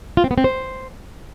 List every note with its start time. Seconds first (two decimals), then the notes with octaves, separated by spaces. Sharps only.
0.17 F4
0.24 C4
0.31 B3
0.38 C4
0.44 C5